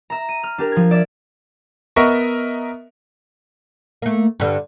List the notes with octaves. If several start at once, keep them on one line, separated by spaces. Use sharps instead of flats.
E5 A#5
D#7
F6
D4 G4 A#4
F3 G#6
D5 E5
B3 A#4 D#5 E5 A#5 C#6
A3 A#3
G2 D3